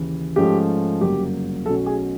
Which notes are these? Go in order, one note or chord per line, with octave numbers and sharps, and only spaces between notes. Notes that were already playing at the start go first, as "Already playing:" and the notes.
Already playing: D#2 C#3 E3
G#2 F3 A3 C#4 G4
G1 F#2 C#3 F#3 A#3 G4
B1 B2 F#3 A3 C#4 A4
G#4